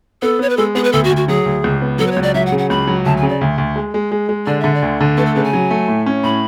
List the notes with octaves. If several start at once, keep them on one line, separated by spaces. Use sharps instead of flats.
B3 A4
B3 C#5
B4
G#3 A4
B3 G#4
B4
D2 A4
F#4
D2
F#4
F#3 G#4
D2
C#2
B3
F#3 A4
B4
C#5
C#2
D5
F#3 E5
F#5
C#3
F#5
C#2 B5
F#3
D2 A5
G#5
C#3
D5
D2
D2
G#3
G#3
G#3
G#3
D3 D5
D3 E5
D5
D2
D3
A3 B4
A4
C#3 B4
G#5
F#3
A3
A2
C#4
A2 B5